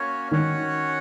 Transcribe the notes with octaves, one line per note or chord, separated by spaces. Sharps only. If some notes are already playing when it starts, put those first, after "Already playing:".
Already playing: A#3 C#4 F#4 C#5
D#3 C#4 F#4 C#5 F#5